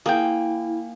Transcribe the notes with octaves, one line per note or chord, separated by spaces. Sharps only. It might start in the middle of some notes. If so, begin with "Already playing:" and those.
A#3 E4 G#4 G5